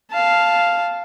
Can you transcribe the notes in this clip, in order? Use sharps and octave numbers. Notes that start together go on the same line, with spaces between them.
F5 A5